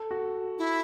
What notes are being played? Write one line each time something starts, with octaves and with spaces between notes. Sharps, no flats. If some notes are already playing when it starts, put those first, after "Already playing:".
Already playing: A4
F#4
E4